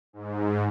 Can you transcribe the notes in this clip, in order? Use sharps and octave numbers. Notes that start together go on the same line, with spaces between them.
G#2